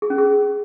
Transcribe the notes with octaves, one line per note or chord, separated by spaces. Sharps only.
G#4
C#4
G#4